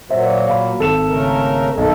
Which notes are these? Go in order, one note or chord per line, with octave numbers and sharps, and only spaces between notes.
A#2 F#3 C5 E5
F5 B5
G#1 A4 E7
C#3 A3 A#4
B1 D#3 A4